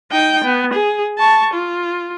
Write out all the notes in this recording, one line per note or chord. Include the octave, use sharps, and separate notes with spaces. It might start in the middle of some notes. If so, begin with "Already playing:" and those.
D#4 G5
B3
G#4
A5 C#6
F4